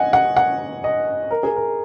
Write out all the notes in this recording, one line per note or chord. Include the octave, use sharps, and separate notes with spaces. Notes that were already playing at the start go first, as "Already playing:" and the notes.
Already playing: D#5 F#5 G#5
F#5
F#5
D#5
A#4
G#4
A#4